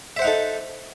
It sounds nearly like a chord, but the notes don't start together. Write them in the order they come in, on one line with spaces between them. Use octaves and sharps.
E5 C5 F#5 D#4 A4